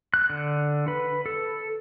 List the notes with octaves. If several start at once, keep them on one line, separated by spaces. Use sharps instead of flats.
F#6
D3
B4
A4